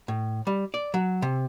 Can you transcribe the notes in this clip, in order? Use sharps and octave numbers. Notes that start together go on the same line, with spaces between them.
A2
G3
D5
F#3
C3